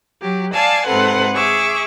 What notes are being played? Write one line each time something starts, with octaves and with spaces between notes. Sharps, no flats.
F#3 G4
D5 F5 G#5 A5 E6
G#2 C3 A4 B4 F#5 C6
G#4 E5 C#6 D6